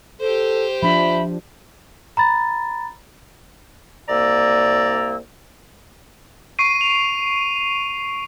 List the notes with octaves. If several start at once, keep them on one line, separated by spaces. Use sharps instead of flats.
G4 A4 C5
F3 D4 E5 B5
A#5 B5 A6
C2 A#3 D5 A#5 E6
C#6 C7 D7 D#7
F7